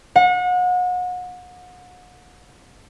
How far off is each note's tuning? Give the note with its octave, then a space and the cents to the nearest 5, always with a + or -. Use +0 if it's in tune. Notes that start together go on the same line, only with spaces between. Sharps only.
F#5 -35